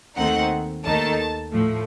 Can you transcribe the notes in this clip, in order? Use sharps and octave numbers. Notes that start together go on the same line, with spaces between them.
D#2 D#3 A3 C4 D#4 F#5
D#2 D#3 A3 D#4 A5
A2 F3 A3